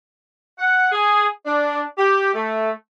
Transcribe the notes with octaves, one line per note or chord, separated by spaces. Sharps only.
F#5
G#4
D4
G4
A3